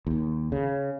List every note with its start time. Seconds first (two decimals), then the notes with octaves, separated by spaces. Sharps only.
0.07 D#2
0.52 C#3